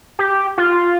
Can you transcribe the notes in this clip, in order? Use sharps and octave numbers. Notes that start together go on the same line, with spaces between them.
G4
F4